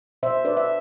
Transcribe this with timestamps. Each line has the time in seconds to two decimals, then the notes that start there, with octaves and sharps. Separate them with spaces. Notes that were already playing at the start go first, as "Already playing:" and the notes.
0.23 B2 C5 E5
0.45 D4 B4 D5
0.57 E5